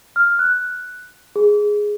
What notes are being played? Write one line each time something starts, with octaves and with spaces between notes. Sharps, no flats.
F6
F#6
G#4